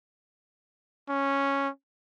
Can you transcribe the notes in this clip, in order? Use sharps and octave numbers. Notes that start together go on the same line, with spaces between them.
C#4